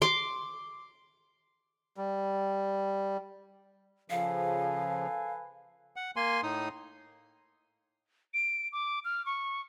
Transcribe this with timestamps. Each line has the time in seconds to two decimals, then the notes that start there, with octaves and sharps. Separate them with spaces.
0.02 C6 D6
1.97 G3
4.10 C#3 F3 A4 B4 F5 G#5
5.96 F#5
6.16 A#3 G#5 C6
6.43 A2 D#4 D#6
8.34 D7
8.72 D6
9.05 F6
9.26 C#6